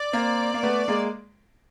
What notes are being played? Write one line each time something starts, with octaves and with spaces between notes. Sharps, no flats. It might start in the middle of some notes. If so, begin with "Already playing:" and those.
Already playing: D5
A#3 C4
A#3
A3 B3
G#3 A#3